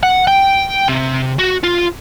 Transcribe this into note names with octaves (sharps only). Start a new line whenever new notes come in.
F#5
G5
C3
F#4
F4